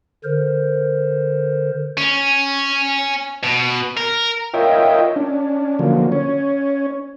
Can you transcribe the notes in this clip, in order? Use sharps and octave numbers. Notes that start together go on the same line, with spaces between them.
D3 A#4 C5
C#4
B2
A#4
F4 A#4 C#5 D#5 E5 G5
C#4 D4
D3 F3 F#3 A#3
C#4 C#5